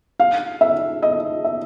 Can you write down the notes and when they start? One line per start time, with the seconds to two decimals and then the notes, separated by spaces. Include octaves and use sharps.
0.20 F5
0.61 E5
1.03 D#5
1.44 E5